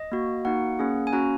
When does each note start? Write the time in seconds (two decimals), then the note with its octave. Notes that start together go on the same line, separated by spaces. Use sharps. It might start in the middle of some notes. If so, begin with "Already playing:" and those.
Already playing: D#5
0.12 A#3 F#4
0.45 A#3 D#4 F#4 F#5
0.79 A#3 C#4 G#4
1.07 G#5
1.13 A#3 C#4 F#4 A#5